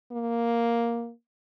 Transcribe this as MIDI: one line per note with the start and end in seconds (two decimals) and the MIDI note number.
0.12 1.11 58